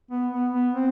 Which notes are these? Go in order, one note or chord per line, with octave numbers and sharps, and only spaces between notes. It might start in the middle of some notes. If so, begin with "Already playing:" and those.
B3
B3
B3
C4